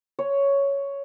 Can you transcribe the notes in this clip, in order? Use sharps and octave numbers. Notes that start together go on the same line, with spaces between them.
C#5